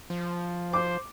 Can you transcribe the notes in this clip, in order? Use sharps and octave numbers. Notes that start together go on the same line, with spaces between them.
F3
C5 D6